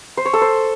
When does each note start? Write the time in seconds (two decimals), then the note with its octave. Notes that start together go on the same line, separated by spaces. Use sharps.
0.17 C5
0.25 C#5
0.33 A4
0.41 C5